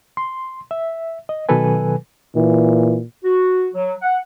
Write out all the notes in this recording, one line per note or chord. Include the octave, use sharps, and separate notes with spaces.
C6
E5
D#5
B2 D#3 F#3 A4 B4 G#5
A#2 E3
F#4
F#3
F#5